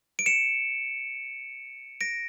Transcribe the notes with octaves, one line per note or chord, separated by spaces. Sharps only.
D7
C#7 E7
A#6 D7